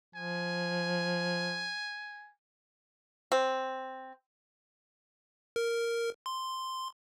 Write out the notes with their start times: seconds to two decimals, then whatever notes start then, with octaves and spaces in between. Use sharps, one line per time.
0.15 F3 G#5
3.32 C4
5.56 A#4
6.26 C6